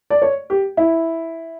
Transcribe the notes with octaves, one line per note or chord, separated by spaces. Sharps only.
D5
C#5
G4
E4